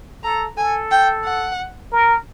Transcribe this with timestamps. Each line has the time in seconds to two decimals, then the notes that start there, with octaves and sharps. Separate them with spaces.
0.23 A4 A#5
0.57 A4 G#5
0.91 G5
1.25 F#5
1.92 A#4